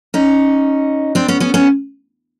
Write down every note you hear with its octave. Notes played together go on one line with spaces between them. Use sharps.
C#4 D#4
C4 D4
B3 C#4
B3 C#4
B3 C#4